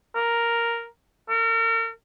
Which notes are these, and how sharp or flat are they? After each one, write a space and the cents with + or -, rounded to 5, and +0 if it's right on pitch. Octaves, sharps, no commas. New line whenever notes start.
A#4 +0
A#4 -40